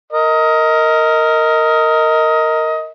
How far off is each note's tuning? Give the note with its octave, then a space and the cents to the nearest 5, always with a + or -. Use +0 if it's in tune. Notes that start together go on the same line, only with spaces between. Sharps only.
A#4 -15 D#5 +20